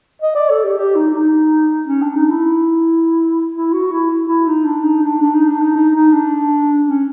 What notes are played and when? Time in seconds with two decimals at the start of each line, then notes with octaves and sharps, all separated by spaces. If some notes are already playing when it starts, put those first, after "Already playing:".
0.22 D#5
0.35 D5
0.50 A4
0.64 G4
0.77 G4
0.95 D#4
1.14 D#4
1.88 C#4
2.02 D4
2.16 D#4
2.30 E4
3.55 E4
3.73 F#4
3.91 E4
4.10 E4
4.28 E4
4.47 D#4
4.65 D4
4.84 D#4
5.03 D4
5.21 D4
5.34 D#4
5.48 D4
5.62 D#4
5.76 D#4
5.95 D#4
6.13 D4
6.87 C#4